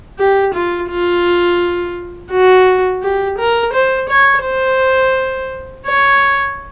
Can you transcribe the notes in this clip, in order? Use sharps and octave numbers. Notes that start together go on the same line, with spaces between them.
G4
F4
F4
F#4
G4
A#4
C5
C#5
C5
C#5